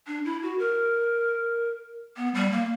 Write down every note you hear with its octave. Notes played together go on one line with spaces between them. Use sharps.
D4
E4
F#4
A#4
B3
G3
A#3